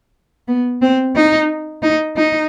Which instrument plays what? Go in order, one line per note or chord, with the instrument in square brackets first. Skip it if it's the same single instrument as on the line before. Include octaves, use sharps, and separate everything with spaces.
[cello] B3
C4
D#4
D#4
D#4